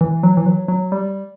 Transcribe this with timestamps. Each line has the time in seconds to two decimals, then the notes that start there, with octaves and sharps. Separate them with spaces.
0.01 E3
0.23 F#3
0.37 E3
0.46 F#3
0.68 F#3
0.92 G3